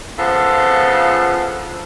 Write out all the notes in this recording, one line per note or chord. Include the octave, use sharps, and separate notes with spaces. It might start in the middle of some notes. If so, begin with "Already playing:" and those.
C#3 F3 B3 F4 A4